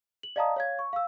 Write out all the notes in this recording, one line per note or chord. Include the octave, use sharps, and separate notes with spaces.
F#7
D5 D#5 F5 A5 A#5 D#6
C#5 F5 G#6
C#6
F5 E6